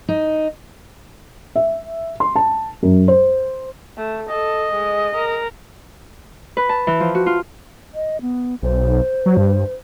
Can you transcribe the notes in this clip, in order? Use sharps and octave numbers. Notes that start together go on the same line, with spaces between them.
D#4
E5
C6
A5
F#2
C5
A3
A4 D#5
G#3
A#4
B4
A5
E3
F3
F#4
F4
D#5
B3
B1 C5
F#3
G2